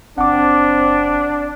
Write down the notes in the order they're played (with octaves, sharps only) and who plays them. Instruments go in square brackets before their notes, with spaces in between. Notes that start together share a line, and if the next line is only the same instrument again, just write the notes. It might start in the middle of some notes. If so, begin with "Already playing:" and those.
[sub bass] F#1 [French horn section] C4 [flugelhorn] D4 [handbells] F#5 D6